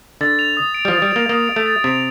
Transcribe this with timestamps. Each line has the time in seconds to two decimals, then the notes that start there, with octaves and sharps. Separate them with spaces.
0.21 D3 A6
0.39 F7
0.57 D#6
0.74 D7
0.85 G3
0.88 F3
0.93 A6
1.02 G3
1.11 A#3 F7
1.29 A#3 D#6
1.48 D7
1.56 A3
1.66 A6
1.84 C3 F7